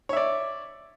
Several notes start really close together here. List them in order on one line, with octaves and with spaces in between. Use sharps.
C#5 E5 D5